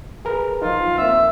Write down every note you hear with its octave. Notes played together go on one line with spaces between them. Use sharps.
G#4 A#4 B4
F3 D#4 F4
A#3 C4 E5